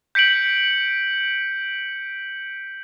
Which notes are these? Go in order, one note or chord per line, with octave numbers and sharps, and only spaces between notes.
G6 B6 C#7 D7 F#7